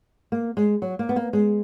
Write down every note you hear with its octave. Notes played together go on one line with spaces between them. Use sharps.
A#3
G#3
F#3
A#3
B3
A#3
G#3